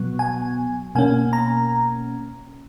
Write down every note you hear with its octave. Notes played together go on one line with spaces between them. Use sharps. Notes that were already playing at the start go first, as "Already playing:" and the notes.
Already playing: B2 F#3 B3
G#5
B2 A#3 C#4 G#5
A#5